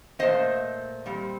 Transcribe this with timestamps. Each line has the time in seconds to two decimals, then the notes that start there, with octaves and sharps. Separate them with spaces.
0.19 A#2 A3 C4 C5 D#5
1.06 A#2 G3 C4